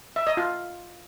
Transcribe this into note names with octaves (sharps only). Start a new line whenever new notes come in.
E5
D#5
F4